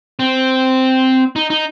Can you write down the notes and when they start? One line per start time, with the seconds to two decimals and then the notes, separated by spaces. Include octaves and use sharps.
0.19 C4
1.36 D#4
1.50 D#4